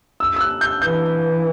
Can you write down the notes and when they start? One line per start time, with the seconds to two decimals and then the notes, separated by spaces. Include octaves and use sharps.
0.20 E6
0.36 E6
0.41 F#6
0.61 G6
0.82 E3 G6